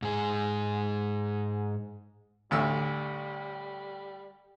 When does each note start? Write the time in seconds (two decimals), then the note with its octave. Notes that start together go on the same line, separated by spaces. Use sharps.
0.02 G#2 G#4
2.51 A1 D2 G3 E6